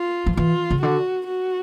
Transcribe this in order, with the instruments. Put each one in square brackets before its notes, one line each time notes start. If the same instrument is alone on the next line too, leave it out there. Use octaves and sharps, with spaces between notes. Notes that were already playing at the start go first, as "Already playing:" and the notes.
Already playing: [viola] F4
[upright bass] F3
[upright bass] E3 [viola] F4
[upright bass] C#3
[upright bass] D3 [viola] F#4
[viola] F#4